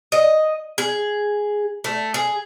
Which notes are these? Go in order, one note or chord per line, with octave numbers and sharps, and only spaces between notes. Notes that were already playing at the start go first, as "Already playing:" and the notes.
D#5
G#4
A3
G#4